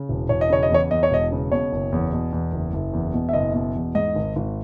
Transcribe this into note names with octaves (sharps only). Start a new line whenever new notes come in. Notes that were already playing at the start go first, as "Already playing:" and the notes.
Already playing: C#3
E1
E1 C#5
D#5
C#3 C#5
D#5
E2 C#5
E2 D#5
C#5
E1 D#5
C#3
B2 C#5
F#1
E2
B2
E2
F#1
F#1
E2
B2
E5
F#1 D#5
B2
E2
G#2 D#5
G#1
G#1